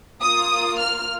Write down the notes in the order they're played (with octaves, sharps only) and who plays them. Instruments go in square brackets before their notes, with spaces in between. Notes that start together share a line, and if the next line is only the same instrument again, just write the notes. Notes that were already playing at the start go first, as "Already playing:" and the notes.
[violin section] A#3 F4 D#6
F6